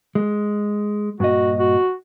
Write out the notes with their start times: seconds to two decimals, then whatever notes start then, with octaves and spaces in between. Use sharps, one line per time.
0.15 G#3
1.20 G2 A#2 F#4 D#5
1.59 F#4